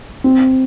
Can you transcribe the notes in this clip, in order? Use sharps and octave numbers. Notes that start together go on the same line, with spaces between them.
C4